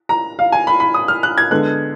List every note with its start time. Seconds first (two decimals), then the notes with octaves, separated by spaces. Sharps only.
0.09 A#5
0.39 F5
0.52 G#5
0.67 B5
0.80 B5
0.94 D#6
1.08 F6
1.23 F#6
1.38 G#6
1.51 D3 G#3 B3 F#6